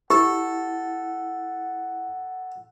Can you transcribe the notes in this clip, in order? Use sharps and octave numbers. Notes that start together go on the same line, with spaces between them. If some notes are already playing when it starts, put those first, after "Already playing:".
E4 G4 A4 F#5